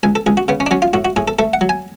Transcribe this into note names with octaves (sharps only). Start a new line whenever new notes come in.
C#2 G#5
A4
C#2 G#4
F#4
C#3 B3
C#4
D4
F#3 C#4
F4
A2 F#4
F#4
A2 G#4
A4
A3 A4
F#5
F#3
G#5